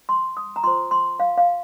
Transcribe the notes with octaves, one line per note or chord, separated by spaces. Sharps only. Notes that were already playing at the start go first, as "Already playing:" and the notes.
C6
D#6
A#5
F4 C5 C6
C6
F5
F5